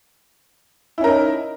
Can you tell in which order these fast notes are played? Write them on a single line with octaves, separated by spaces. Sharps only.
E4 C#4 A#4 D#4